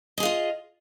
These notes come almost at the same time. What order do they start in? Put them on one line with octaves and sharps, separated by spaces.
D#5 G#4 F5 F4